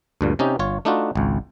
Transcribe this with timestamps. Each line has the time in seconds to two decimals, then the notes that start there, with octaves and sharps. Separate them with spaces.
0.21 D2 G2 A#2
0.39 C3 C#4 D#4 G4
0.59 G1 F4 C#5
0.85 A3 D4 D#4 F4 F#4
1.15 G#1 C#2